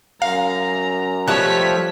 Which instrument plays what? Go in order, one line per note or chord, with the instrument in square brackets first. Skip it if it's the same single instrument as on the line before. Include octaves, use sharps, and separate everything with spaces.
[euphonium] F#2 [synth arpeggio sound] F5 [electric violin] A#5
[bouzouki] F3 G3 A3 [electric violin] C#5 B6 [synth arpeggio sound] A5 F#6